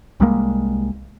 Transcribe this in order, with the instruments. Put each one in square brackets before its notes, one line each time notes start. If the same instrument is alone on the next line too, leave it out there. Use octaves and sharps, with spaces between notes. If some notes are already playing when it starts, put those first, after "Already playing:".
[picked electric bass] C2 G3 G#3 A#3